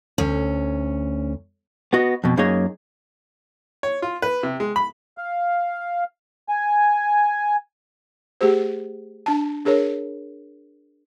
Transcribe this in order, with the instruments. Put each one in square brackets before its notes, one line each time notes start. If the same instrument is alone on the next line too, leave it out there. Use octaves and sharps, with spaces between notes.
[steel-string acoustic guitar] D2 C#4
[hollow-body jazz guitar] B3 F#4 D#5
F2 B2
F#2 A#3 D#4 G#4 C#5 D#5
[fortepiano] C#5
F4
B4
C3
G#3
B5
[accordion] F5
G#5
[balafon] A3 G4 G#4 C5
D4 A5
D4 G#4 A#4 C#5